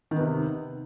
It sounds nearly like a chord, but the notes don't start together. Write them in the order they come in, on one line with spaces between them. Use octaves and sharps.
D#3 B3 C3